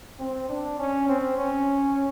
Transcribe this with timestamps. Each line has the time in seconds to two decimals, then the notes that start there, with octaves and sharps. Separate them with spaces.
0.19 C4
0.49 D4
0.79 C#4
1.09 C4
1.38 C#4